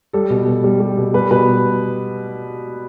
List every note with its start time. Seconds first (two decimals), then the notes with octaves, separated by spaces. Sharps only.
0.13 G3 A4
0.30 B2
0.47 B2
0.64 G3
0.80 G3
0.98 B2
1.14 G3 B4
1.31 B2 B4